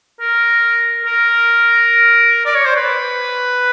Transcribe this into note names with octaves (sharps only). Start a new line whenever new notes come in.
A#4
A#4
D5
C#5
C5
B4